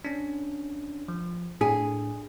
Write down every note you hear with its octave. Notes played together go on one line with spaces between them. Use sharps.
C#4 D4
F3
A2 D4 G#4